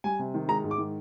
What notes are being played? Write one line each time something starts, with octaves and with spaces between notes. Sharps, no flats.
G3 G#5
C3
D#3
G#3 A#5
G#2
D6
D#3